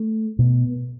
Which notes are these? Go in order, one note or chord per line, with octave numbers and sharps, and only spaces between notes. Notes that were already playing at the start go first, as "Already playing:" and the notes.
Already playing: A3
B2 B3